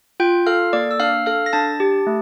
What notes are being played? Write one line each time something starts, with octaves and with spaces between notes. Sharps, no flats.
F4 G5 G6
A4 F5 F6
A#3 D5 D6
E6
D4 F5 F6
A4 F5 F6
A#6
D4 A5 A6
G4
A3